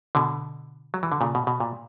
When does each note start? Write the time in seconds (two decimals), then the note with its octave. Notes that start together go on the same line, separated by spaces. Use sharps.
0.15 B2 D3
0.94 F#3
1.03 E3
1.12 D3
1.21 A#2 C#3
1.35 B2
1.47 B2
1.60 A#2